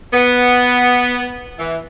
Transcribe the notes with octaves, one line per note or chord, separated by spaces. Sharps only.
B3
E3